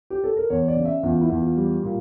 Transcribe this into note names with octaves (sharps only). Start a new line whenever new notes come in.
G4
A4
A#4
E2 C#5
D5
C#3
E5
E2 F4
E4
E2
F4
G3
A#2